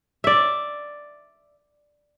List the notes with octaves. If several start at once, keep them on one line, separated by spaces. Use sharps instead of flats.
D5 E5